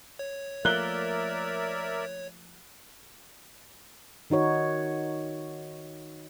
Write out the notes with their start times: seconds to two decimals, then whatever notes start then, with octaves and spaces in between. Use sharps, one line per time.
0.19 C#5
0.65 F3 A3 A#3 A#4 D5 E5 F#6 G7
4.30 D#3 D#4 F#4 C#5